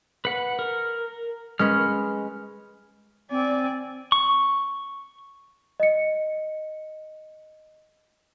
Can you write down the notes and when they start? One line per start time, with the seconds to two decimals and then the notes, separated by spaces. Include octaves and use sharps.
0.25 B4 F#5
0.59 A#4
1.59 G#3 C#4 B4 F6
3.31 C4 D5 G#5
4.12 C#6
5.80 D#5 C#7